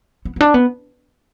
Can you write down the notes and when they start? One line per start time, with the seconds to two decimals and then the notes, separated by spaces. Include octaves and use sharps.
0.25 B3
0.36 B3
0.41 D4
0.54 B3